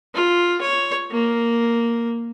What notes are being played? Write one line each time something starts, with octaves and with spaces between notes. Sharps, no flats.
F4
C#5
A#3